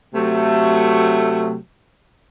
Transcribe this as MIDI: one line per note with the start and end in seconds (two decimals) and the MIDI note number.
0.14 1.56 48
0.14 1.56 54
0.14 1.56 57